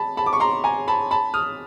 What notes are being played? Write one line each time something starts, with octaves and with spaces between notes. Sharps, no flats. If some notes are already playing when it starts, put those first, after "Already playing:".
Already playing: A5 B5
A5 B5
D6
C#6
A#5 C6
G#5 A#5
A5 B5
A5 B5
D#6 F6